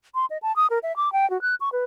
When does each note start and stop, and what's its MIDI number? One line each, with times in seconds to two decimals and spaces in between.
0.15 0.26 84
0.30 0.38 75
0.42 0.54 81
0.56 0.67 87
0.70 0.79 70
0.83 0.95 76
0.96 1.12 86
1.13 1.28 79
1.30 1.40 66
1.42 1.55 90
1.60 1.69 85
1.72 1.84 71